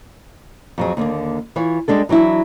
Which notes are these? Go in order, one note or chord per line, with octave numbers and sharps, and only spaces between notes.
F2 F#3 G#4
D#2 D3 A#3
E3 F4 C#5
G3 G#3 D4 A4
E3 F#3 D4 E4